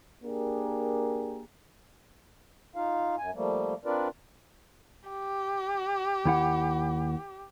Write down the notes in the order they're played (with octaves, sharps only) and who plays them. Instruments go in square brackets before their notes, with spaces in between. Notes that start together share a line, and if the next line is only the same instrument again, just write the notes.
[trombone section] A#3 D4 G4 G#4 A#4
[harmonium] D#4 F4 F5
F#2 G#5
F3 G3 A3 A#3
C4 D4 F4 A#4 B4 D5
[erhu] G4
[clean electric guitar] D#2 E4 F#5